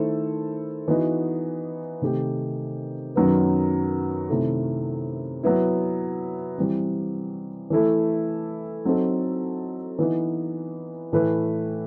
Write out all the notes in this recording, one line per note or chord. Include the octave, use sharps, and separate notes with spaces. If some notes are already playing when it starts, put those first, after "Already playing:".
Already playing: D#3 A3 E4 A4 C5
E3 B3 D#4 F#4
C3 D#3 A3 D#4 G4
F#2 D#3 F#3 B3
C3 D#3 A3 E4 A4
F#3 B3 E4
E3 G3 C4
E3 A3 E4 A4
F#3 C4 D#4 A4
E3 B3 D#4
A2 E3 A3 E4 B4